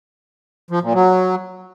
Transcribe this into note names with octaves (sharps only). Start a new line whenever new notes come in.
F3
A#2
F#3